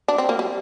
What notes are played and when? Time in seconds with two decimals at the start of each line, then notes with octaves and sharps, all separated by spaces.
0.08 D4
0.18 C4
0.29 A#3
0.39 G3